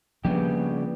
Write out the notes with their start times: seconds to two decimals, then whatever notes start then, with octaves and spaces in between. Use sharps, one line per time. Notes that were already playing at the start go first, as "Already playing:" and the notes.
0.25 C#3 F3 G3 A#3 B3 D4 G4